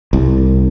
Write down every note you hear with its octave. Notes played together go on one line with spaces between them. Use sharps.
C2